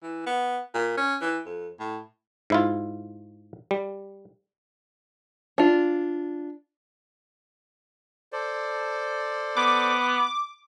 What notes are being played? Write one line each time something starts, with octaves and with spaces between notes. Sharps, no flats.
E3
B3
A#2
C#4
E3
F2
A2
G#2 E4 F4
G3
D4 F4
A4 C5 D5
B3 D6